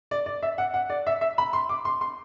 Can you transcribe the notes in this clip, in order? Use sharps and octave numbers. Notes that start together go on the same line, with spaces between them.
D5
D5
E5
F#5
F#5
D5
E5
E5
B5
C6
D6
C6
C6